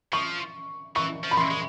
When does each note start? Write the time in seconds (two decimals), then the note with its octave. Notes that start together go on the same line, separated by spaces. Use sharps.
0.12 F3 C#6
0.96 E3 C#6
1.24 F3
1.31 B5
1.37 C6
1.51 G#3